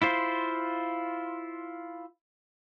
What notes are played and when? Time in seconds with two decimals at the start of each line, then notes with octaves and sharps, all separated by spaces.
0.02 E4 F4 C5